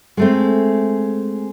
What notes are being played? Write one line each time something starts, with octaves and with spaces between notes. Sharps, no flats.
G#3 A3 C4